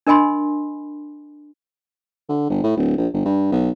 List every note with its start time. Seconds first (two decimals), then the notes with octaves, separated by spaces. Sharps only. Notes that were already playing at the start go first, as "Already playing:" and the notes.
0.07 D4 A#4 D#5 G#5 B5 C6
2.29 D3
2.50 G1
2.63 A2
2.77 D1
2.97 A#1
3.13 G1
3.25 G2
3.52 B1